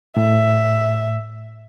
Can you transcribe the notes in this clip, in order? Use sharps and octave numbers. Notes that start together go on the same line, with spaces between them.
A2 E5